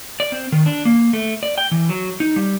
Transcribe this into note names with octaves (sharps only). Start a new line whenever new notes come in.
D5
C4
D#3
D4
A#3
A3
D5
G5
E3
F#3
D#4
G3